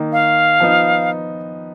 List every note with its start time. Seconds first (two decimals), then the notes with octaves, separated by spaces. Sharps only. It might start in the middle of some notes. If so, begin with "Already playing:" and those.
Already playing: D#3 A#3 D#4
0.12 F5
0.60 F3 B3 D#4